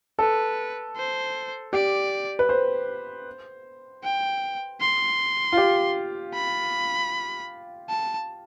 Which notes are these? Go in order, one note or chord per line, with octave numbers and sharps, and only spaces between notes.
A4 B4
C5
G4 D5
B4
C5
G5
C6
F4
G4
B5
A5